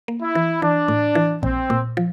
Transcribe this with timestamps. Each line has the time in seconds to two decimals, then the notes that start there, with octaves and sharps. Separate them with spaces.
0.08 A#3
0.22 E4
0.35 E3
0.62 E3 D4
0.88 A2
1.15 E3
1.43 A#1 C4
1.70 A#2
1.97 F3